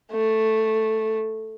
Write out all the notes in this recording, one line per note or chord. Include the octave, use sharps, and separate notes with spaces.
A3